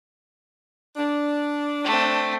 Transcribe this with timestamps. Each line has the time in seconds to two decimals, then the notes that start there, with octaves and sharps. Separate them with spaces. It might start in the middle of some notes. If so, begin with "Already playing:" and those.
0.96 D4
1.84 A3 C4